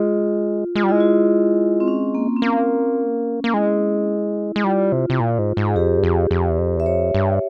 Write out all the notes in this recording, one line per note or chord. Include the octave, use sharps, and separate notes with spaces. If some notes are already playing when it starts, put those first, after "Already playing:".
Already playing: G#3 F4
G#3 F4
G3
G#3 E4
F4
C4
C#4
A#3
C4
A#3 C#4
A#3
G#3 E4
G#3
G3 F4
C3
C3
A#2
G#2
G#2
G#4
F2 G4
G2
F2
F2
E2
F2
E2 E5
F2 C#5
G2